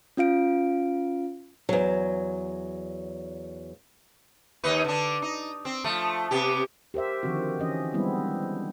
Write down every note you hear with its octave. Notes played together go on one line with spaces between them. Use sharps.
C#4 F4 F5 D7
E2 F#3
D#2 D#4 B4
D3 D4
D#4
C4
F3 A3
C3 B3 G4
G4 A#4 C5 E5
D3 D#3 F3 C4 F#4
E3 C#4 D#5
G3 G#3 B3 C4 D4 E4